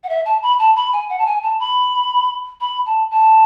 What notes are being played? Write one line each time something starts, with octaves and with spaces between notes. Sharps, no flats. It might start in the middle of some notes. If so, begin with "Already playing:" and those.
F#5
E5
A5
B5
A5
B5
G#5
F#5
A5
G#5
A5
B5
B5
A5
A5